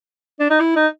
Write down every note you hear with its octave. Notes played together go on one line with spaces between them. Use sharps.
D4
D#4
E4
D#4